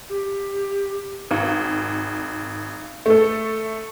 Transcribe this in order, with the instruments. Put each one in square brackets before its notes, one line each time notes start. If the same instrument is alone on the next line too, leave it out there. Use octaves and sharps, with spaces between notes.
[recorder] G4
[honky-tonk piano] G#1
A3 A4